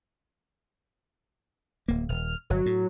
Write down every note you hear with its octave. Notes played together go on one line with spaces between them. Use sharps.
D1 A#3
D#1 F6
G1 F#3
A2